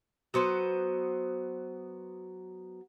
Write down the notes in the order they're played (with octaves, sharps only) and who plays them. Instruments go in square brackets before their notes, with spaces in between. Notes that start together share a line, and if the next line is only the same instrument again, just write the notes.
[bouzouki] F#3 B3 C5 F#5